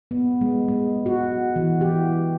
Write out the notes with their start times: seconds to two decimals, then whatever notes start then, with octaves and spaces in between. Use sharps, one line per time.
0.11 B3
0.41 G#3
0.68 G#3
1.06 F#4
1.56 E3
1.81 G4